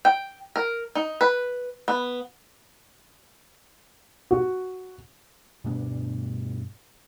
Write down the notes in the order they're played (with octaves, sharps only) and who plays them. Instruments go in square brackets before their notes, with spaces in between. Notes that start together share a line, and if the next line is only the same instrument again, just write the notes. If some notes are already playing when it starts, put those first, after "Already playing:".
[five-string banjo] G5
A#4
D#4
B4
B3
[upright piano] F#4
[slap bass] G2 B2 G3 D4